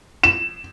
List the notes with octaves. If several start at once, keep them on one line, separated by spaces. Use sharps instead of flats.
E7